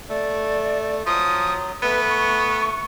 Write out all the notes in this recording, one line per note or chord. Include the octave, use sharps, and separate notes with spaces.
A3 D5
F3 F#3 D#6
A3 B3 B4
C#6